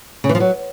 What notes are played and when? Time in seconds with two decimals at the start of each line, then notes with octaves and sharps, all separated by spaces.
0.24 C#3
0.29 E3
0.35 F3
0.40 F#3